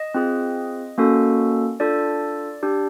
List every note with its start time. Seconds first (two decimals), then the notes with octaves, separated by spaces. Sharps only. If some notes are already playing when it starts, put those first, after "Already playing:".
Already playing: D#5
0.14 C4 F4 G#4
0.98 A#3 C#4 F#4 A4
1.80 D4 F4 A4 D5
2.63 D4 G4